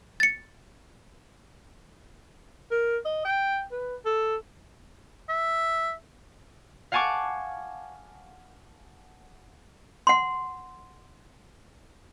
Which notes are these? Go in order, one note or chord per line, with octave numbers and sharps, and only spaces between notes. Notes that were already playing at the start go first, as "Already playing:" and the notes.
A6 C#7
A#4
D#5
G5
B4
A4
E5
F5 F#5 G#5 A5 C#6 D6
F#5 C6